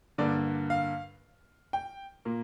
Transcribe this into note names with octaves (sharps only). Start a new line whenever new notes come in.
G2 D3 A#3 D5
F5
G5
A#2 A#3